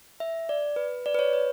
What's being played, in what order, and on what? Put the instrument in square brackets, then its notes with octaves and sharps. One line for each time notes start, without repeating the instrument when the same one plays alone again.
[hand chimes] E5
D5
B4
D5
B4
C#5
B4